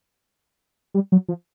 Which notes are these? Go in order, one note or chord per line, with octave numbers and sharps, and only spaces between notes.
G3
F#3
F3